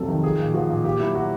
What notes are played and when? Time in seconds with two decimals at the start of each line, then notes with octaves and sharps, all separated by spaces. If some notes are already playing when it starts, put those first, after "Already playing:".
Already playing: F2 C3 F#3 A4
0.08 D#3
0.23 F3 G#4
0.39 A#2
0.54 F3 F#4
0.70 A#2
0.84 A#2 G4
1.00 F#3 E4
1.15 F#3 F#4